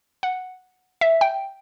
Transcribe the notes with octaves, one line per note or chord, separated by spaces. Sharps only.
F#5
E5
G5